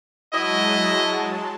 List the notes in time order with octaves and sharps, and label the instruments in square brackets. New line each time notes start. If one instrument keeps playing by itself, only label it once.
[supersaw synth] F#3 G#3 A5 [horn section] E4 F#4 D#5